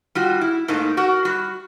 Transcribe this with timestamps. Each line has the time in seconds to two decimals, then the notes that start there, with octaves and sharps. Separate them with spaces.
0.15 G3 F4 F#4
0.41 E4
0.68 G#2 A3 A#3 D#4
0.97 F#4 A#4 F#5
1.25 G3 F#4